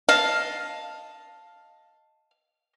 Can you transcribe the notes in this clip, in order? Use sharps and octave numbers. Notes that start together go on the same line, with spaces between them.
D#5 F5 A5 F6